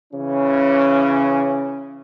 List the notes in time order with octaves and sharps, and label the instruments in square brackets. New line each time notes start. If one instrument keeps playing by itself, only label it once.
[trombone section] C#3 E3 C#4